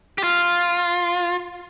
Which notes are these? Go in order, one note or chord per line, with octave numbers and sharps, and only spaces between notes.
G4
F4 F6